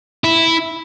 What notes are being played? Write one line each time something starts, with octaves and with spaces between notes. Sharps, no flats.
E4